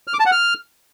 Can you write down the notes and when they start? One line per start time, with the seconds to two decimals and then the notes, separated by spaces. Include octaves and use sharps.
0.07 F6
0.14 D6
0.20 A5
0.26 F#5
0.32 F6